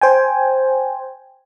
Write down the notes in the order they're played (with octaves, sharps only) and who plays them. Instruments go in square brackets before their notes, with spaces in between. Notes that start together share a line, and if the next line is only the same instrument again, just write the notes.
[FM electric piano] C5 G5 G#5